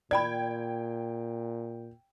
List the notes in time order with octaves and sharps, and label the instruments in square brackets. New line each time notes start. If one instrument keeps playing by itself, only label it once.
[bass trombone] A#2 [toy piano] D5 B5 [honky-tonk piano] G5 G#6